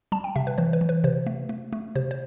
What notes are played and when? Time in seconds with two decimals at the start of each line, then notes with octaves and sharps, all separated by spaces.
0.12 G3 A5
0.24 G5
0.36 C3 E5
0.47 B4
0.58 E3 C5
0.73 B4
0.81 E3
0.89 B4
1.04 C3 C5
1.27 A3
1.49 A3
1.73 A3
1.95 C3 C5
2.11 C5